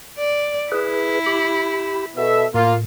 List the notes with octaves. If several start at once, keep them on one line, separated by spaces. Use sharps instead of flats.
D5
E4 G#4 B4
G4 B5
B2 A4 E5
A2 A#3 F4